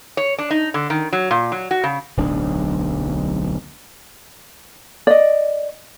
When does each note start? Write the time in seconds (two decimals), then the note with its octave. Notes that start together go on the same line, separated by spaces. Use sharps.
0.17 C#5
0.38 D4
0.50 D#4
0.74 D3
0.90 D#3
1.13 F#3
1.31 A#2
1.52 F#3
1.71 F#4
1.84 C#3
2.17 D1 B1 D4
5.07 D5 D#5